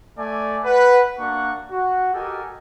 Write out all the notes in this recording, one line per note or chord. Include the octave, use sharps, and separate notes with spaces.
A3 D5 G#5
B4 F#5
A#3 D4 F#4 F#5 C#6
F#4
F#4 G4 A4 A#4 D#5 G#5